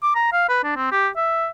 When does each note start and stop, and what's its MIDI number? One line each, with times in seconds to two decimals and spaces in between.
0.03 0.11 86
0.15 0.29 82
0.33 0.45 77
0.49 0.62 71
0.64 0.73 62
0.76 0.87 60
0.92 1.09 67
1.17 1.48 76